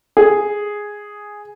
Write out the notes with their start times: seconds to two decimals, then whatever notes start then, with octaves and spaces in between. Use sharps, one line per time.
0.17 G#4